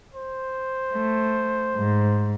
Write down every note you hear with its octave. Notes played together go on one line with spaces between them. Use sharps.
C5
A3
G#2